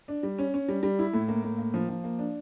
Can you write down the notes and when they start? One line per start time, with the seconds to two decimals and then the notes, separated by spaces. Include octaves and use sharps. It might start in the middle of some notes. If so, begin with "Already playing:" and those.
0.08 D4
0.23 G3
0.39 C#4
0.54 C#4
0.69 G3
0.83 G3
0.99 E4
1.14 A2
1.28 A#3
1.44 A2
1.59 A#3
1.74 F3
1.89 F3
2.04 A#3
2.19 D4